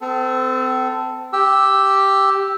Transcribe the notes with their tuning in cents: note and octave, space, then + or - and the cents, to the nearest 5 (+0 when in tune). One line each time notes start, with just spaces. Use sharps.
C4 -35 A4 +0
G4 +0 E6 +0